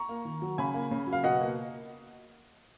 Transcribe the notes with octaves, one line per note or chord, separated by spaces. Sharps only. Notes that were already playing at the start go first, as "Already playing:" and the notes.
Already playing: A#5 C#6
A#3
D#3
F#3
C#3 G#5 B5
A#3
C#3
F#3
F5
B2 D#5 F#5
A#3